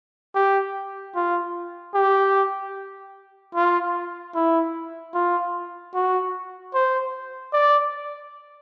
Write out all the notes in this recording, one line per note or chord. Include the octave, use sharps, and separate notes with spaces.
G4
F4
G4
F4
E4
F4
F#4
C5
D5